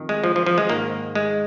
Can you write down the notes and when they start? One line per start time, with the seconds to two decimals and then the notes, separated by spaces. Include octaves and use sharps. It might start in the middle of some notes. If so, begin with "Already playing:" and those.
Already playing: F2 D#3
0.09 G#3
0.24 F3
0.36 F3
0.46 F3
0.58 G#3
0.69 G#2 D#3 A#3
1.15 G#3